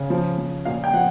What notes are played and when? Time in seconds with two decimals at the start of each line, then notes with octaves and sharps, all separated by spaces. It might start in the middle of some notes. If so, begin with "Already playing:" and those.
Already playing: C#3
0.10 F3
0.38 F3
0.65 A#2 F5
0.84 G5
0.93 F3 F#5